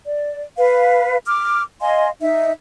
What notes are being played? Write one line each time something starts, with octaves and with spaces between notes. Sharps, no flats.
D5
B4 F5
D6 F6
D#5 F5 G#5 C6
D#4 E5